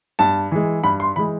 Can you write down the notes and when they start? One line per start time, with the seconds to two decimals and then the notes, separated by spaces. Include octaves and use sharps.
0.19 G2 A5
0.51 E3 G#3
0.83 G2 B5
1.00 C6
1.16 E3 G#3 B5